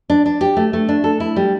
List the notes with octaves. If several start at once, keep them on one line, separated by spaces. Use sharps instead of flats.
D4
D4
G4
A3
A3
D4
A4
E4
G3